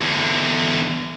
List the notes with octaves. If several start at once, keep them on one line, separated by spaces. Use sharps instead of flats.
E2 D3